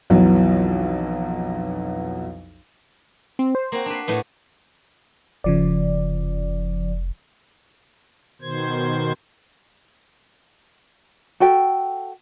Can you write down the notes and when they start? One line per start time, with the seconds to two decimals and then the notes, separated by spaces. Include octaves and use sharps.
0.10 B1 F2 E3 F#3 B3
3.39 C4
3.55 C5
3.72 A#3 C4 F#4
3.86 D4 B4 C7
4.08 A2 A3 B3
5.44 F1 C#3 F3 D5
8.41 B2 D#3 C5 G#6
11.40 F#4 A4 G5